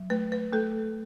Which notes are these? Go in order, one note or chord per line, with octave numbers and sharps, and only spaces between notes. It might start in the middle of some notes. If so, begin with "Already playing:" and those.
Already playing: F#3
A3 B4
B4
A3 A4